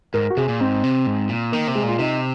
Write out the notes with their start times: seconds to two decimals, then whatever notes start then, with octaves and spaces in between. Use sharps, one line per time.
0.14 G#2 A#4
0.30 F#4
0.37 C3 G#4
0.48 A#2
0.60 G#2 C4
0.84 C3
1.07 G#2
1.29 A#2
1.52 D#3 A#3
1.68 C3
1.75 G#3
1.83 A#2 F4
1.99 C3 D#4